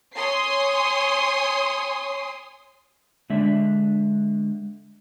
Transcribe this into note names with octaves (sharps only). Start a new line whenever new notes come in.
C#5 G#5 C6 D#6 C7
D3 G#3 D4 E5